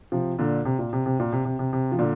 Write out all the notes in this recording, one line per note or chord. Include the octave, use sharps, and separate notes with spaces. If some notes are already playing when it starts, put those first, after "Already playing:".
C3 F3
A#2 D3
C3
A#2
C3
C3
A#2
C3
C3
C3
C3
F3
A#2 D3